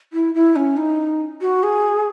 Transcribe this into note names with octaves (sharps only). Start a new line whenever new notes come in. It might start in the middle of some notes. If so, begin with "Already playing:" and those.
E4
E4
C#4
D#4
F#4
G#4